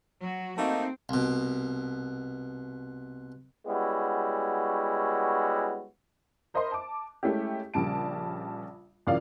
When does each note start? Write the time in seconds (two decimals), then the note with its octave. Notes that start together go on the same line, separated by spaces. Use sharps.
0.21 F#3 F#4
0.58 A3 A#3 C4 D#4
1.09 C2 B2
3.67 G3 G#3 B3 C#4 E4 F#4
6.54 A#4 C5 D#5 E5 B5 C6
6.71 A5 D6
7.23 G#3 A3 C#4 E4 G4
7.74 A#1 C#3 G3 A5 D7
9.07 A1 F#2 C#3 F4 D5 F5